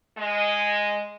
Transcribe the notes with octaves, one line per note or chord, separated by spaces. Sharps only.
G#3 D#5